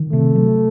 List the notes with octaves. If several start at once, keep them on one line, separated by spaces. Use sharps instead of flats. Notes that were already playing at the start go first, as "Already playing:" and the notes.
Already playing: D#3
C3 A3
F#3